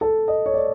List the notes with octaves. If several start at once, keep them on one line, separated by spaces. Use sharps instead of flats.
A4
D#5
C#5
D5